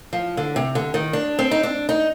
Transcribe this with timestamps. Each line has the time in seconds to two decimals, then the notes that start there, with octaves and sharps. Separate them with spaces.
0.13 F3
0.37 D3
0.56 C3
0.75 D3
0.94 D#3
1.13 D4
1.39 C4
1.51 D#4
1.63 D4
1.89 D#4